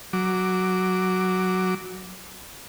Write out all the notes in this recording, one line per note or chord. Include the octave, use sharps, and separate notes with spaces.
F#3 D6